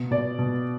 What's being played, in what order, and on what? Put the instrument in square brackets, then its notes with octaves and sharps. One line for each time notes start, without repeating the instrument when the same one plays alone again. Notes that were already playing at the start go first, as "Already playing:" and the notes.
Already playing: [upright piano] B2
B2 D5
B2